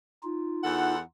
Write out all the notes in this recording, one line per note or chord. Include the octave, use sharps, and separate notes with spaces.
D#4 F4
E2 A4 F#5